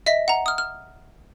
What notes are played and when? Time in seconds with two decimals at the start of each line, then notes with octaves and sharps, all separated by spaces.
0.06 D#5 E5 A#6 B6
0.28 F#5 A#5
0.46 D#6 F6
0.58 F6